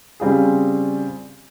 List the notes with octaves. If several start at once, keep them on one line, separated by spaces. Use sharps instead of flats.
C#3 G3 C4 F4 G#4